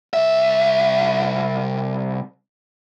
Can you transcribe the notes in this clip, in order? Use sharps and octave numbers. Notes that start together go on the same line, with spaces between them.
C2 E5